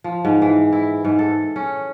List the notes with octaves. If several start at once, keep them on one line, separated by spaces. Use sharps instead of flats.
F3
G#2
E3
E4
G#2
A4
C#4